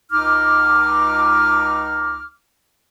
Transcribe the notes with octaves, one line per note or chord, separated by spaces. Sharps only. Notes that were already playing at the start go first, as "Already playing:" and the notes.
C#2 D#4 D6 F6